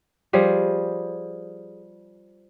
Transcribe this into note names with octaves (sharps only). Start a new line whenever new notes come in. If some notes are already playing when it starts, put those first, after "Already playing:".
F3 G3 G#4